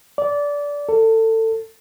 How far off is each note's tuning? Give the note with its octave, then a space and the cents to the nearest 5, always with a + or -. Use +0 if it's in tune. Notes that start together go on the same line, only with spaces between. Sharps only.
D5 -20
A4 +25